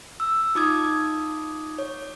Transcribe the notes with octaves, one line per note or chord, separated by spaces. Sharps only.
E6
D#4 F4 D6 D#6 G#6
C#5